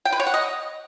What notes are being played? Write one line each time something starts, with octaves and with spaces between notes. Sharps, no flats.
G5
B4
C#5
F#5
D#5